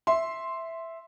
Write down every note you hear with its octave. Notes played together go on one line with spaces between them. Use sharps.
E5 C6